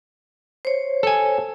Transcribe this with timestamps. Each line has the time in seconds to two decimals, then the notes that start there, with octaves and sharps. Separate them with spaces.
0.65 C5 C#5
1.03 A4 G#5